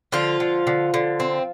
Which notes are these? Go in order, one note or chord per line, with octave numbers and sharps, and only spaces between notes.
D3 F3 F4
D3
D3
D3
C4